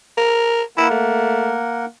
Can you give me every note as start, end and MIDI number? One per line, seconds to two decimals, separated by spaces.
0.17 0.62 70
0.78 1.85 58
0.78 0.89 64
0.78 1.85 70
0.78 1.85 78
0.91 1.60 57